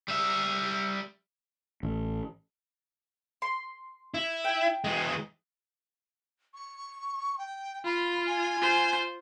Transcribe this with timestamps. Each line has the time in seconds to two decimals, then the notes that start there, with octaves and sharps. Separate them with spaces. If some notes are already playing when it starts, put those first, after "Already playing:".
0.08 G3 E5
1.83 A1
3.42 C6
4.14 E4
4.44 G5
4.84 E3 G#3
6.54 C#6
7.38 G5
7.85 F4 B5
8.26 G#5
8.59 F4 C5